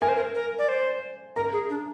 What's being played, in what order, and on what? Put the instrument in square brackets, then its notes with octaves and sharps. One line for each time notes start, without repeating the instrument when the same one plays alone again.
[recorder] A#4 [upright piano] G#5
[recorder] C5
A#4
A#4
D5
C5
[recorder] A#4 [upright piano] A#5
[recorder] G#4
D4